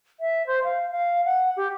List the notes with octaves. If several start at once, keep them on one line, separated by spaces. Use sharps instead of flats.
E5
C5
F5
F5
F#5
G4